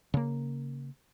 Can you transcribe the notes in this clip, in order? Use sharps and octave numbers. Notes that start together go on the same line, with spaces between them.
C#3 A#3